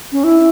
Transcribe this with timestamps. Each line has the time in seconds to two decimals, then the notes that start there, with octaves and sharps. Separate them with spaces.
0.12 C#4
0.24 E4